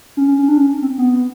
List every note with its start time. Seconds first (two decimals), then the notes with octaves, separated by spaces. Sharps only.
0.17 C#4
0.28 C#4
0.39 C#4
0.48 D4
0.57 C#4
0.82 C4
0.98 B3